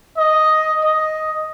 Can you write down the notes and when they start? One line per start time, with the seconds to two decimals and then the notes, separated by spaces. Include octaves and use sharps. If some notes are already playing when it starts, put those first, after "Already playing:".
0.18 D#5
0.84 D#5